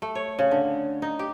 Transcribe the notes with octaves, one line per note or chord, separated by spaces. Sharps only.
A3
C#5
C#3
D3
D#4
G4